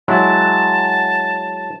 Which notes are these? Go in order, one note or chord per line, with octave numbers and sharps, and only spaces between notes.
F#3 G#3 E4 A5